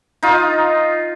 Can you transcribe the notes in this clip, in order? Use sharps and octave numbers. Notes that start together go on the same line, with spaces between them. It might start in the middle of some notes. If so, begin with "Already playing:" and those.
D#4 F4